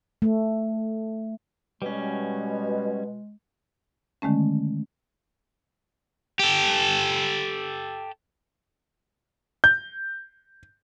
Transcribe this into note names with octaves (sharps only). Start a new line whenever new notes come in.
A3
B2 G3 G#3 C#4
D3 D#3 G#3 A3 C#4
G4 A4
G6